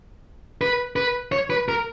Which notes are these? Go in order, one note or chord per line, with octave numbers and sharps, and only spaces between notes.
B4
B4
C#5
B4
A#4